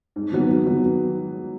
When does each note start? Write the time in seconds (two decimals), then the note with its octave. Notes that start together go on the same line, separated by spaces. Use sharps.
0.16 G#2
0.32 D#3 F#3 B3
0.49 G#2
0.65 D#3 F#3 B3